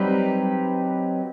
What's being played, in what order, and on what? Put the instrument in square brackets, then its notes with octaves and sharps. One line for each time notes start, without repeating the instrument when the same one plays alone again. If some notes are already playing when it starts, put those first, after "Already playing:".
Already playing: [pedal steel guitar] F#3 C4 D#4 G4 B4 [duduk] G3